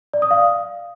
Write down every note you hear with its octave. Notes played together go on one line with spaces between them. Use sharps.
D5
D#6
F5